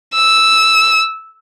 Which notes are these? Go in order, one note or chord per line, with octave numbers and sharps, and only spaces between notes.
E6